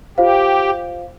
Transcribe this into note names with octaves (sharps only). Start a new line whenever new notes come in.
F4 G4 C5 F5